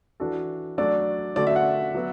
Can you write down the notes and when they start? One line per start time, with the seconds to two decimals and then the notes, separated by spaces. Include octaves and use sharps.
0.20 E3 D4 F#4 A4
0.78 F#3 A3 D4 F#4 A4 D5
1.36 D3 A3 F#4 A4 D5
1.47 E5
1.56 F#5
1.95 F#3 B3 F#4